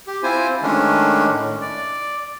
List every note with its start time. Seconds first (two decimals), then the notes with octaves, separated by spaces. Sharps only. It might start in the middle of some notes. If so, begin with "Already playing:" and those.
0.07 G4
0.23 C4 E4 F4 C5 G#5
0.63 D#3 G#3 A3 C#4 D4
1.30 A2
1.61 D5